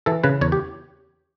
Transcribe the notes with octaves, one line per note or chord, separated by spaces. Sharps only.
E3 A4
C#3 B4
E2 C#5
G4